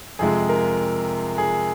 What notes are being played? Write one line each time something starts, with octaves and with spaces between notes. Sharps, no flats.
F2 C3 F3 G#3 G#4
A#4
G#4